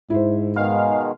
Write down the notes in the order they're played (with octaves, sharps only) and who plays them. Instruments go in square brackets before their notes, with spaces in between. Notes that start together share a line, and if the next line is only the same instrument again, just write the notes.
[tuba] G#2 [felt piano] E4 C5
[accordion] B2 D#3 G#3 [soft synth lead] F5 [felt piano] F6